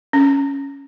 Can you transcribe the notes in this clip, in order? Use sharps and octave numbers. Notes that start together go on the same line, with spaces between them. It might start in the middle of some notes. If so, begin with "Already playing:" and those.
C#4